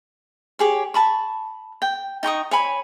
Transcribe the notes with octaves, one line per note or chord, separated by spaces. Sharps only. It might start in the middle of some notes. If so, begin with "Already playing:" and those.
G4 G#4 C#5
A5 B5 C#6
G5
D#4 G5 C#6 D#6
C#5 G#5 B5